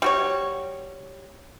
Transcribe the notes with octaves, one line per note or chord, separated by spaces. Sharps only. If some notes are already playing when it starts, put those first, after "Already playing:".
G3 F#4 C#5